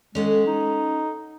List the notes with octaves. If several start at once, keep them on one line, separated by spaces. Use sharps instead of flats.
G#3 C#4 A4 F#5
D#4